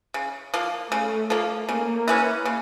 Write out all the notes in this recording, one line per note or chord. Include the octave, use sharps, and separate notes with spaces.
C#3
F3 A#3
C#3 A3
F3 A#3
C#3 A#3
E3 G#3 C#4
C#3